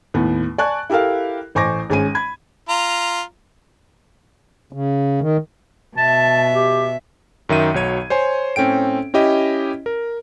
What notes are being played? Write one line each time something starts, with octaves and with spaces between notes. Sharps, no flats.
D#2 A2 B3
D5 G#5 A5 C#6 F#6
E4 G4 A4 A#4 F5
A1 C5 G#5 C#6 D6 A#6
G#1 G#3 C#4 G#5 D#7
B5 G#6
F4 A#5
C#3
D#3
B2 E5 A5
G4
F#2 D#3 E5 D#7
B1 F#3 C#5 G#6 D#7
C5 C#5 G#5 C6
A2 C4 C#4 A4 G5 D7
C#4 E4 G4 D#5
A#4